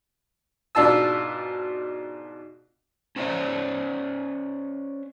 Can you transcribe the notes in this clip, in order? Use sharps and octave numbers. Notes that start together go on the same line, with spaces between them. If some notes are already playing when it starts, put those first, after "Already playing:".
G#2 B2 D4 F4 A5 E6
C#4 C5 D5 E5